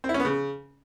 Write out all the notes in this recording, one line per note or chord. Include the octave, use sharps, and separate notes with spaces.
C4
E4
C#4
B3
C#3